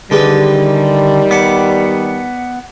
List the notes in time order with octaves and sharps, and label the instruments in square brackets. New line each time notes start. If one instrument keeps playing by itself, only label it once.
[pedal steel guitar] D3 [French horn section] D#3 G3 [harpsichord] G#3 G4 B4
[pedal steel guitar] B3 F#5 [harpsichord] D5 A5